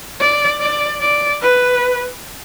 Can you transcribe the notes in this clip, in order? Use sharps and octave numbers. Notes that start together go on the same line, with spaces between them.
D5
D5
D5
B4